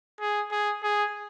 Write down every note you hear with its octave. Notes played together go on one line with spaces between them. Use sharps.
G#4
G#4
G#4